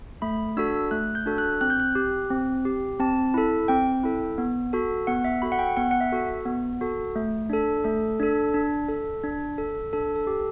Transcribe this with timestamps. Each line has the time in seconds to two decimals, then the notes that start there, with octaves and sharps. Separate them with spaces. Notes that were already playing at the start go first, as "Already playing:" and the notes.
0.22 A3 B5
0.57 D4 F#4 A4 E6
0.91 A3 F#6
1.15 G6
1.26 D4 F#4 A4
1.38 F#6
1.61 C4 F#6
1.70 G6
1.80 F#6
1.95 G4
2.30 C4
2.65 G4
3.00 C4 A5
3.34 E4 A4
3.68 C4 G5
4.04 E4 A4
4.38 B3
4.73 F#4 A4
5.07 B3 F#5
5.24 E5
5.42 F#4 A4 B5
5.52 F#5
5.59 G5
5.77 B3 F#5
5.91 F#5
6.01 E5
6.12 F#4 A4
6.46 B3
6.81 F#4 A4
7.16 A3
7.50 D4 A4
7.84 A3 A4
8.20 D4 A4
8.54 D4
8.89 A4
9.24 D4
9.58 A4
9.93 D4 A4
10.16 A4
10.27 G4